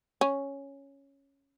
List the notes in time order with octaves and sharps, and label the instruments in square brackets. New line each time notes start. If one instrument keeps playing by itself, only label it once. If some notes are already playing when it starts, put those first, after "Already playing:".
[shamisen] C#4